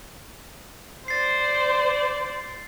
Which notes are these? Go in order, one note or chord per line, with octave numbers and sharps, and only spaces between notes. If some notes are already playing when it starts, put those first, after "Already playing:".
C5 D5 A6 C7